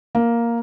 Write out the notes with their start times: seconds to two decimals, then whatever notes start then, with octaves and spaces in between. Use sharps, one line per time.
0.15 A#3